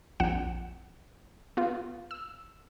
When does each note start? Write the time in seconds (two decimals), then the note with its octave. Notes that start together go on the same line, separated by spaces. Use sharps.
0.20 A#1 F2 F#5 C#7 E7
1.57 B3 F4
2.11 E6